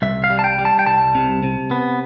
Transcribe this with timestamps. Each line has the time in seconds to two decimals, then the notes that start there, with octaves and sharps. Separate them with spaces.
0.02 C2 E5
0.24 F5
0.30 G3
0.39 A5
0.44 G5
0.59 G3
0.65 A5
0.79 G5
0.87 C2 A5
1.15 C3
1.43 C3
1.71 B3